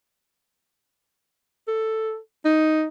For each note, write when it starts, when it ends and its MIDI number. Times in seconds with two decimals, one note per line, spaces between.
1.68 2.18 69
2.45 2.87 63